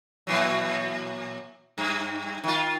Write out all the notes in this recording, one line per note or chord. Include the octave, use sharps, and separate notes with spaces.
A#2 E3 F#3
G2
D#3 F4